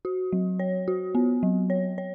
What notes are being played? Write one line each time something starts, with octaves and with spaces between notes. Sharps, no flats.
F#4
F#3
C#5
F#4
B3
F#3
C#5
C#5